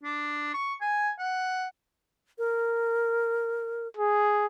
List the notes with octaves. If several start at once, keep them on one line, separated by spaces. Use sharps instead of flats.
D4
C#6
G#5
F#5
A#4
G#4